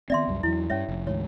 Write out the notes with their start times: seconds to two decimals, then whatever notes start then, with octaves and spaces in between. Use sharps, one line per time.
0.10 D#3 B3 C4 D5 E5 C6
0.28 C2 F#2 G3
0.43 E2 F3 F#3 E4
0.70 G2 G3 C#4 C#5 E5
0.89 F1
1.07 D2 G#2 E3 C#5